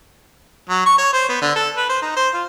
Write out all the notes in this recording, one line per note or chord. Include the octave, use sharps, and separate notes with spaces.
F#3
C#6
C#5
C5
B3
D3
A4
B4
C5
D#4
C5
F4